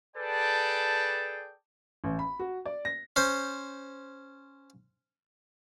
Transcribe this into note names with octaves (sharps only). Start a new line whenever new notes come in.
G#4 A4 B4 D5 G5 A5
A1
B5
F#4
D5
A#6
C#4 C5